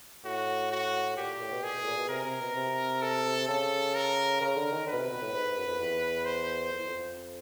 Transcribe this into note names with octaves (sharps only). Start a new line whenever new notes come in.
A2 F#4
F#4
A#2 G4
A2
B2
A#2 G#4
B2
A2
A#2
B2
C3 A#4
C3
B2
C3
A4
C#3 A4
A#4
C#3 A#4
D3
D#3
D3 B4
B2
C3
B2
A2
G#2
G#2
F#2
F2
E2
C5
F2
E2
F2